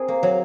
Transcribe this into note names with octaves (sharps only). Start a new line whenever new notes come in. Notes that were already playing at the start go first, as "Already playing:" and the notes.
Already playing: C4 G#4 A#4
A#3
F#3